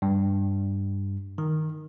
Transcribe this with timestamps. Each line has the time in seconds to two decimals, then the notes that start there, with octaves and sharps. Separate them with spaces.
0.02 G2
1.38 D#3